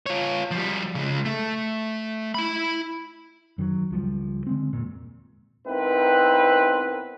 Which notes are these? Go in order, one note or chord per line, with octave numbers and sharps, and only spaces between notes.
F4 C#5
F3 G3
C#3 G#3
A3
E4 B5
F#2 D#3 E3 F#3
C#2 F3 G3
D3 G#3 C4
E2 G2 A#2
G#2 B3 C4 E4 A#4 B4